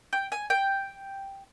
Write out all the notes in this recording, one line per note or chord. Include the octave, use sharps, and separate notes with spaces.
G5
G#5
G5